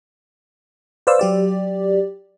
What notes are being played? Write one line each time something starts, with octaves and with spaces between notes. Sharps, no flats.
B4 C5 D5 F5 E6
F#3 G4 D5